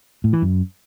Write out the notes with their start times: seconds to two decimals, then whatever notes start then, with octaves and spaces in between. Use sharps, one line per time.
0.24 A2
0.33 E3
0.42 F#2